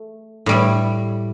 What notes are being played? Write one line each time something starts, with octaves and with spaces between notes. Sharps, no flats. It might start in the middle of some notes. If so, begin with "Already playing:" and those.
Already playing: A3
A2 G3 E4